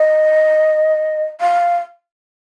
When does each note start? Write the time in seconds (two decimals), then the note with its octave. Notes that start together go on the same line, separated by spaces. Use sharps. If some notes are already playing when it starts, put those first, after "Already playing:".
Already playing: D#5
1.41 F5